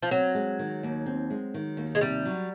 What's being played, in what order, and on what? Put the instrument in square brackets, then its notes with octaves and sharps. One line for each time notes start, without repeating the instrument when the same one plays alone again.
[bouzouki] F3
[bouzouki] F#3 [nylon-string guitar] C4
[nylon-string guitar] G#3
D#3
D#2
C4
G#3
D#3
D#2
[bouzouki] G#3
[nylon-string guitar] C3 [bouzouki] G3
[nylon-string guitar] F#3